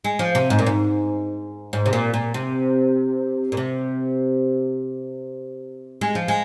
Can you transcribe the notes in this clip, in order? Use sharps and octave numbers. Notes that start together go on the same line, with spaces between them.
G#3
F3
C3
G#2
A#2
G#2
G#2
C3
A#2
A#2
C3
A#2
C3
G#3
F3
G#3